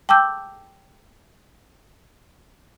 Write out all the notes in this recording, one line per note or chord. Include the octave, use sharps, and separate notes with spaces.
G5 A5 D6 E6 G6